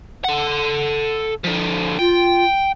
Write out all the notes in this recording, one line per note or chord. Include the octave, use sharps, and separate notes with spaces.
A4 F#5
D3 F3
F4 G5